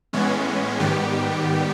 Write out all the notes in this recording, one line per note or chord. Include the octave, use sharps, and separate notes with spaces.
A2 E3 G#3 B3 C#4
G#2 D#3 G3 B3 G4